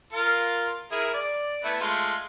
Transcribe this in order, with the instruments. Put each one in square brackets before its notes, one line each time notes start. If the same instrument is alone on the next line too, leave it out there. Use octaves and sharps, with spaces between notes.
[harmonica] F4 A#4 F5
E4 G#4 A#4
D5
A3 B3 E4
G#3 A3 F4